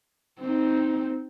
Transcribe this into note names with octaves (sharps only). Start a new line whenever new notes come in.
C4 D#4